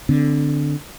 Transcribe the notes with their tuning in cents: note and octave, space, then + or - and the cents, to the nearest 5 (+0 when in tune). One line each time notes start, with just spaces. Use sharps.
D3 +0 C4 -25